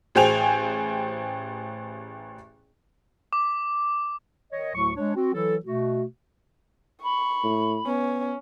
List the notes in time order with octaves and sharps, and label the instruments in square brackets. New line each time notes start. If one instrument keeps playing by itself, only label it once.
[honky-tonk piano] A1 G#4 C5 G5 G#5 F7
[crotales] D6
[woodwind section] D#3 C#5 D#5
D2 A2 F#3 C#6
G#3 D4 C#5
C4 F#4
E3 F#3 E4 A4
B2 A3 F#4
[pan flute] B5 [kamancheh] C#6
[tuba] A2
[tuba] B3 [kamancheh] C#4